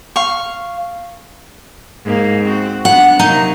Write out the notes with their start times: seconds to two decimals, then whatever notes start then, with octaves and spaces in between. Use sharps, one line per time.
0.16 F5 C#6
2.05 G#2 A#3
2.44 C4 F#4
2.85 B3 D4 F#5
3.19 C3 F#3 A#3 D#4